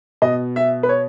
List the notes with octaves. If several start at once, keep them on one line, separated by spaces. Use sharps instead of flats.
B2 D#5
E5
B4
C#5